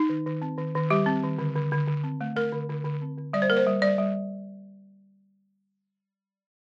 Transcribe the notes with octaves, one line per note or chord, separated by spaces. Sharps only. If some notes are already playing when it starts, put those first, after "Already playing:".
Already playing: D#4
D#3
D#3
C4
D#3
D#3
G3 G4
C4
D#3
D3
D3
D3
D3
C4
A3
A3 A#4
D3
D3
D3
C4
D3
G3 D5
C5
A#3 A#4
C5
G3
G3 D5
G3